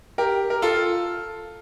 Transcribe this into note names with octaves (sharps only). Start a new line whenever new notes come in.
G4 A#4
A#4
F4 A4